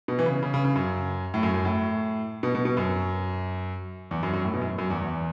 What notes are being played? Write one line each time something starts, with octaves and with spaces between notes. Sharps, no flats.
B2
E3
C#3
C#3
C#3
C#3
F#2
A2
F#2
F#2
A2
B2
B2
B2
F#2
E2
F#2
F#2
A2
B2
F#2
F#2
E2
E2